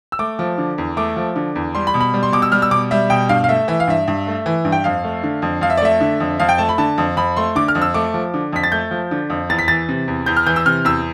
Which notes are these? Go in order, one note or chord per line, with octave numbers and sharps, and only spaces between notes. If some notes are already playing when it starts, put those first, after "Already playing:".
E6
A3 D6
F3
D3
E2
A3 D6
F3
D3
E2
G3 C6
B5
B2
B5
G3
C6
B2 D6
E6
G3 F6
E6
B2 D6
G3 E5
B2 G5
G2 F5
F5
A3 E5
E3 E5
F5
G2 E5
G2
A3
E3
G2
G5
F2 F5
A3
D3
F2
F2 F5
E5
D5
A3 E5
D3
F2
F2 F5
G5
A3 A5
B5
D3 A5
F2
F2 B5
A3 C6
D3 D6
F6
F2
E6
A3 D6
F3
D3
F2 B6
A6
A3 G6
F3
D3
F2
E2 A6
B6
E3 A6
C3
E2
E2 G6
F6
E3 G6
E6
C3 F6
E2 E6